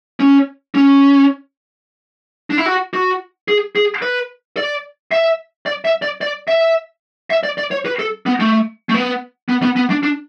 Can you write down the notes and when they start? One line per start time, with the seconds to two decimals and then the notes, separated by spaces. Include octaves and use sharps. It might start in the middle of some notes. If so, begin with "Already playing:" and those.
0.20 C#4
0.75 C#4
2.50 D4
2.58 E4
2.66 F#4
2.94 F#4
3.48 G#4
3.76 G#4
4.02 B4
4.57 D5
5.11 E5
5.66 D5
5.85 E5
6.02 D5
6.21 D5
6.48 E5
7.30 E5
7.43 D5
7.58 D5
7.71 C#5
7.86 B4
7.99 A4
8.26 B3
8.40 A3
8.89 A3
8.94 B3
9.49 B3
9.62 B3
9.76 B3
9.90 D4
10.03 D4